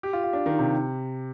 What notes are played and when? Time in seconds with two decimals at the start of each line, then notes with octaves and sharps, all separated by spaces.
0.03 G4
0.13 F4
0.24 F4
0.33 D4
0.46 D#3
0.59 C3